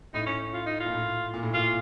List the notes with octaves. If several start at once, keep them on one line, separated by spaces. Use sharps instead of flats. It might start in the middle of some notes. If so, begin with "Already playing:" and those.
A2 D#4
C#4
F4
D#4
F4
A#2
A2
A#2
A2
A#2 F4